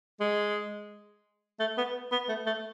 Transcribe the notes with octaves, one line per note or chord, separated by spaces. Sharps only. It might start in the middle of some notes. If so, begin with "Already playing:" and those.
G#3
A3
B3
B3
A3
A3